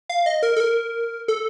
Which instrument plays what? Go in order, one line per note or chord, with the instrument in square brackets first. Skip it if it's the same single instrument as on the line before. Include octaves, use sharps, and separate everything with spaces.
[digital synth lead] F5
D#5
A#4
A4
A#4
A4